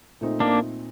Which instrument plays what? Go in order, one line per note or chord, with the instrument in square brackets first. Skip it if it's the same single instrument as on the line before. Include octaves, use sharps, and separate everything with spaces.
[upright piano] A#2 A3 C4 D#4
[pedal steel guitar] A#3 D4